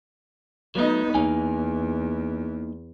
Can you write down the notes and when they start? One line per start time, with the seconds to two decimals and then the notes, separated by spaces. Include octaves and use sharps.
0.75 F#3 A3 B3 D#4
1.15 E2 A#3 D#4 G#5